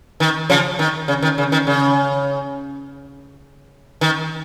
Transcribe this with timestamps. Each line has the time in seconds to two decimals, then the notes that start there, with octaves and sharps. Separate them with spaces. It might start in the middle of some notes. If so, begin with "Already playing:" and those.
0.20 D#3
0.50 C#3 F3
0.79 D#3
1.08 C#3
1.22 D#3
1.38 C#3
1.52 D#3
1.67 C#3
4.01 D#3